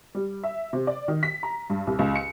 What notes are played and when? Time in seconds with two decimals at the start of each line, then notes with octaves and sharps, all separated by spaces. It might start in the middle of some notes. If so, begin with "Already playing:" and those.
0.15 G3
0.44 E5
0.73 C3
0.87 D5
1.08 D#3
1.23 B6
1.43 A#5
1.70 G2
1.87 C2
1.99 C#2
2.16 C#7